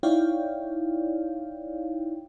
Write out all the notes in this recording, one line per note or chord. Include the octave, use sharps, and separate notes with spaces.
D#4 E4 C#5 D5 F5 G5